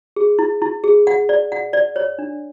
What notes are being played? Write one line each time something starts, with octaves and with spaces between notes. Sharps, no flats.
G#4
E4
E4
G#4
F#5
D5
F#5
D5
C#5
D4